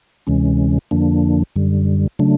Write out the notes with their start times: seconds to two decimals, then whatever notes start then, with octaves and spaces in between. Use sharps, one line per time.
0.27 D2 C3 E3 G#3 C#4
0.91 F2 D3 F3 A#3 D4
1.56 F#2 D3 G3
2.19 C#3 F#3 A3 D4